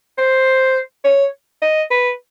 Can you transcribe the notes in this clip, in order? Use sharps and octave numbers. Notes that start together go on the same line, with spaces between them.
C5
C#5
D#5
B4